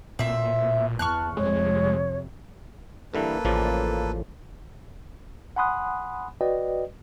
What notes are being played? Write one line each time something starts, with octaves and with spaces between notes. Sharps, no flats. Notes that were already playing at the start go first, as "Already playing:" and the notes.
A#2 C4 E5
E2 A5 C#6 F6 F#6
F2 C3 G#3 C#5
G2 D3 E3 A#3 A4 B4
A1 C#3 F3 D5
F#5 G#5 B5 C6 D#6 F#6
F#4 B4 D5 D#5 G5